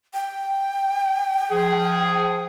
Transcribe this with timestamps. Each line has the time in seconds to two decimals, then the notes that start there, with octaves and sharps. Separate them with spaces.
0.14 G5
1.51 F3 G#4